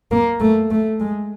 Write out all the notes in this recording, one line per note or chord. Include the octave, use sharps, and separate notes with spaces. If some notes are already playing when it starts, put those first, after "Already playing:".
A#3
A3
A3
G#3